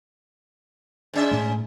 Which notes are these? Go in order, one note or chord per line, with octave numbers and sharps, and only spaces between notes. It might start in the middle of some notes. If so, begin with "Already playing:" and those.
G#2 C#4 E5
A2 G#3